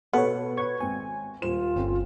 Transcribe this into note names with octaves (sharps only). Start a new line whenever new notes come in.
B2 B3 A4 B4 C#5 C#7
B4 C#5 C#6 G#6
G#1 C4 G#5
D#1 F4 C5 E7
G1 C4 C#4 A4